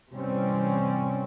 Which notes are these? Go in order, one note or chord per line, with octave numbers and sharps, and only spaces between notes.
C3 E3 G3 C4 C#4